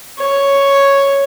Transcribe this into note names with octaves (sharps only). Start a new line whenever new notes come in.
C#5